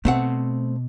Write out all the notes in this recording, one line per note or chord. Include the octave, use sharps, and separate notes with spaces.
B2 A3 C4 F#5